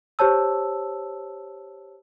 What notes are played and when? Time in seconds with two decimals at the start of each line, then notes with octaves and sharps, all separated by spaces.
0.19 G4 C5 C#5 A5 E6